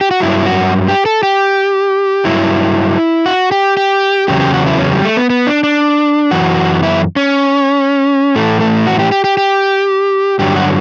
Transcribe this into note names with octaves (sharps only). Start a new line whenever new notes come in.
G4
F#4
G2 F#3 E4
F#4
G4
A4
G4
G2 F#3 E4
F#4
G4
G4
E2 C#3 F#3 G4
G4
F#4
E4
C#4
G3
A3
B3
B3
D4
D4
F#2 E3 F#4
E4
C#4
A2 E3 A3
A3
F#4
G4
G4
G4
G4
G2 D3 F#3 G4
F#4